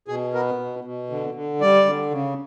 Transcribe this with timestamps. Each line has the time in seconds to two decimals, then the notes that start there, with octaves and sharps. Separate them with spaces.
0.08 B2 G#4
0.34 B3 A#4
0.59 B2
0.84 B2
1.10 D3
1.34 D3
1.61 G3 D5
1.85 D3
2.10 C#3